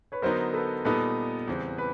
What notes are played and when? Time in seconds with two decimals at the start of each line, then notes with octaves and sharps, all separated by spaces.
0.12 B4 C#5
0.22 D3 F#3 B3 D#4 A#4 C5
0.54 A4 B4
0.85 A#2 G3 B3 D#4 A4 B4
1.48 E2 C#3 E3 G3 C4
1.78 B4